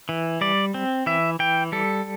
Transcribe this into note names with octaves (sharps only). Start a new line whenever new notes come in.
E3
G3 D5
C4
E3 E5
E3 G5
G3 A4